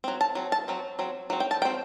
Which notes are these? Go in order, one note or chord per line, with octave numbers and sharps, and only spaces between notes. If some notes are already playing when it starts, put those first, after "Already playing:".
F#3 C4
A5
F#3 C4
A5
F#3 C4
F#3 C4
F#3 C4
G5
A5
F#3 C4 G5